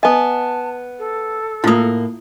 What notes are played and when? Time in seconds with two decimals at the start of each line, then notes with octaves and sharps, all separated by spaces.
0.03 B3 D#5 G#5 A5
0.99 A4
1.64 A2 A#3 E4 F4 D#6